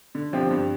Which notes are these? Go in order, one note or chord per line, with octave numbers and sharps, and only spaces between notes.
D3
F3 C4 G4
G2